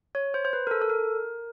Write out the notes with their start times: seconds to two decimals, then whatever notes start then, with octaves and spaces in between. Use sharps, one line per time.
0.15 C#5
0.34 C5
0.45 C5
0.53 B4
0.67 A#4
0.71 A4
0.82 A4
0.90 A#4